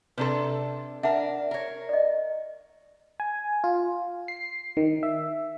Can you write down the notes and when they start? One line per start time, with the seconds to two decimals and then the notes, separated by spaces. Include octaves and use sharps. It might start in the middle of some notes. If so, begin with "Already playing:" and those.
0.18 C3 D4 A4 B4 A#5 C6
1.03 D4 A#4 E5 F#5 A5
1.51 A#4 C#5
1.89 D5 D#5
3.20 G#5
3.64 F4
4.28 C7
4.77 D#3
5.03 E5